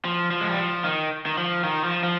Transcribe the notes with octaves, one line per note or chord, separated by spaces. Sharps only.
F3
F3
G#3
G3
F3
D#3
D#3
F3
D#3
F3
F3